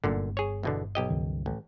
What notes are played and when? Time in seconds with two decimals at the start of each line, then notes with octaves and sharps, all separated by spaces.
0.04 G1 F#2 A#2 D3
0.37 G#4 C#5
0.63 E2 B2 D3
0.95 B1 G4 D#5
1.10 C#2 G2 D#3
1.46 A1